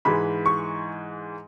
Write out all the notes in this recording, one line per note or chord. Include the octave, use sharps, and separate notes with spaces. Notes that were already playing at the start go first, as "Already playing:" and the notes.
G#2 E3 G#3 B5
C#6